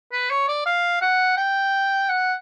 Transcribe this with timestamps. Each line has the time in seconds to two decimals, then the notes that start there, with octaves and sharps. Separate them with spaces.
0.13 B4
0.30 C#5
0.48 D5
0.66 F5
1.01 F#5
1.37 G5
2.09 F#5